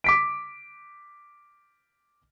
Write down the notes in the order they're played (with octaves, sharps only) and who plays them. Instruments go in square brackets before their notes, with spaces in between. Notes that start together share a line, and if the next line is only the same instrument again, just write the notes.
[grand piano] D6 B6 D7